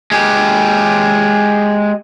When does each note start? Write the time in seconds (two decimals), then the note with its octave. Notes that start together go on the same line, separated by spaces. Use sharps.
0.12 G#3 G4